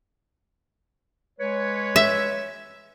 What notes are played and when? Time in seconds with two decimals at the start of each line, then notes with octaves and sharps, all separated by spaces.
1.39 G#3 B4 C#5
1.96 E5